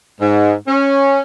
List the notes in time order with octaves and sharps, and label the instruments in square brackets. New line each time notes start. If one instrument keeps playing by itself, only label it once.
[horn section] G#2
C#4